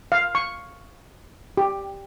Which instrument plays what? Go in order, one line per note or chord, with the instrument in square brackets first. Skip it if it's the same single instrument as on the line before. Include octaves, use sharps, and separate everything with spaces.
[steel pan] F5
C#6
G4